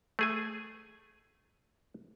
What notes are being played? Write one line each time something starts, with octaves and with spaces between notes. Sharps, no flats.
A3 G#4 G#5